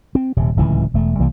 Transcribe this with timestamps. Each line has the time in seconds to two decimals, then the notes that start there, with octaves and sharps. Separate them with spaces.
0.15 C4
0.36 D#1 C3
0.56 D1 C#2 C3 E3
0.94 E1 A3
1.19 C2 E3 G3 A#3